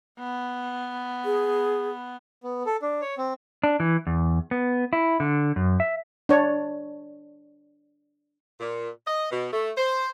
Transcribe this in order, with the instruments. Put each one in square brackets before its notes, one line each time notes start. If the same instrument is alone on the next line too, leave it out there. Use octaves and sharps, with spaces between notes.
[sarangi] B3
[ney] G#4
[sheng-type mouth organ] B3
A4
D4
C#5
C4
[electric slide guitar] D4
E3
E2
B3
E4
D3
F#2
E5
[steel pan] D4 C#5
[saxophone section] A#2
D#5
B2
A3
C5